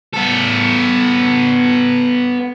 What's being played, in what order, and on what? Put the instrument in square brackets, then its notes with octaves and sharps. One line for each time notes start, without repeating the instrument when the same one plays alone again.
[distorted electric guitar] B3 A4